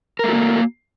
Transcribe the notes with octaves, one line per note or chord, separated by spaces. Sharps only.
A3 A#3 F#4 A#4